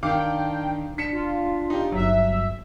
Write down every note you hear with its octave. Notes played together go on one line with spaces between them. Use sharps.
D#3 D4 F5 G5 D6
D4 B6 C#7 E7
F4
D#4 G4
G1 F#3 E5